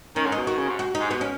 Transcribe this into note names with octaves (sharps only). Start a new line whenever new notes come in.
D#3 C#4
G#2
B2 D#4
D#3 F#4
C#3
G#2
F#4
G#2 D#4
B2 B3
C#4